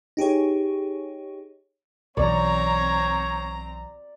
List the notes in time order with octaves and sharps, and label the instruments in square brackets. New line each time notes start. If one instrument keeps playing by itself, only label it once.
[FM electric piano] D#4 G4 G#4 C#5
[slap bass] B1 E3 [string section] C4 A#5 [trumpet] C#5 [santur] D5